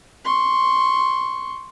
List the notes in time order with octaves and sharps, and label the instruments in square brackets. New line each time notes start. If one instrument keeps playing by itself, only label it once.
[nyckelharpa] C6 C#6